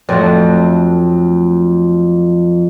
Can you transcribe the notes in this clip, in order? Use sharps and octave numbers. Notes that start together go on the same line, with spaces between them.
F2 F#3 A3